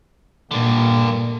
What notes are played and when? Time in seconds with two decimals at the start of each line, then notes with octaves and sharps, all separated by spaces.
0.51 G2 A#2 D3